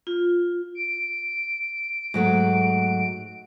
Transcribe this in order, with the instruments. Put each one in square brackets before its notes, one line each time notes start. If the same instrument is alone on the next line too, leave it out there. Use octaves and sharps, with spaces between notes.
[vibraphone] F4
[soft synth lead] D7
[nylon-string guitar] G#2 F#3 A3